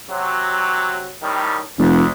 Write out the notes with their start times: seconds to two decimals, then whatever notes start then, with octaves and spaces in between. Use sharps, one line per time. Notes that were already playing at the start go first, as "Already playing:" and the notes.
0.11 C3 F#3
1.23 A2 D#3 G3
1.79 F1 D2